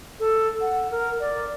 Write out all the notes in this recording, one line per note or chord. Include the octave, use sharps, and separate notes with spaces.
A4
F#5
A#4
D5